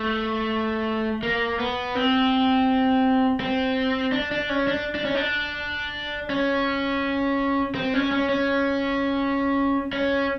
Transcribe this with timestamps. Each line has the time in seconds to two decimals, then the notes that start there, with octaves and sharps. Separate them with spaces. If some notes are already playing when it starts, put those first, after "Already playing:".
Already playing: A3
1.23 A#3
1.59 B3
1.95 C4
3.40 C4
4.12 D4
4.31 D4
4.49 C#4
4.67 D4
4.95 D4
5.05 C#4
5.15 D4
6.30 C#4
7.75 C4
7.94 C#4
8.11 C#4
8.29 C#4
9.93 C#4